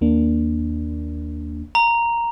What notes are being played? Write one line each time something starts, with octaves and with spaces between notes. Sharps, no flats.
D#2 A#3 D4
A#5